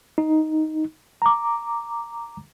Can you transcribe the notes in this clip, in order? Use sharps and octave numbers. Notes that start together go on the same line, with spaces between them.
D#4
A#5 D6